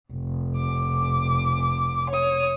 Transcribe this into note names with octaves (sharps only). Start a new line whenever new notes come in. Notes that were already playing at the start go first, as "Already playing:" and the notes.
F1
D6
C#5 D#6